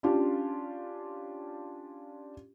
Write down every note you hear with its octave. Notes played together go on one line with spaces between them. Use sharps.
C#4 D4 F4 G4